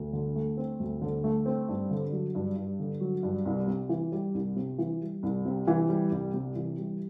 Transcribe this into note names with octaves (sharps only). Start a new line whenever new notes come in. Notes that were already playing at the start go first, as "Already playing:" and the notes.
Already playing: D2
D3
A3
C4
D2
D3
A3
C4
G2
D3
F#3
G2
G2
D3
F#3
G2
C2
C3
E3
G3
C2
C3
E3
G3
C2
C3
E3
G3
C2
C3
E3
G3